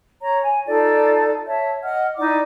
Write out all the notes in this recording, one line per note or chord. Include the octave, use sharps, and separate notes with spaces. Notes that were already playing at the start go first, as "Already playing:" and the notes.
C#5 A#5
G#5
D#4 F4 A4 D5
C#5 E5 A5
D#5 F#5 F6
D#4 E4 D5 D6